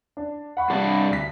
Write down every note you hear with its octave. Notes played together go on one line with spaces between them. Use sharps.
D4
F#5 B5 C#6
G2 C3 D4
D2 B6